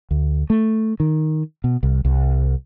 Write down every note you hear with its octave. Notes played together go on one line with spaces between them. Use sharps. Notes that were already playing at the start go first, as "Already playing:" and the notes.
D2
A3
D#3
B2
C2
C2